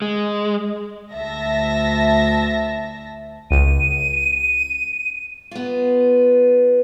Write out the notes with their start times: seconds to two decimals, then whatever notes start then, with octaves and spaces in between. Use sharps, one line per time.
0.02 G#3
1.12 D2 E5 A5 A#6
3.51 C#2 D#7
5.51 B3 F4